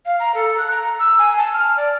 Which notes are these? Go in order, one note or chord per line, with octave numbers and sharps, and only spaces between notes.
F5
A#5
A4
F#6
A#5
E6
G#5
A5
F6
D5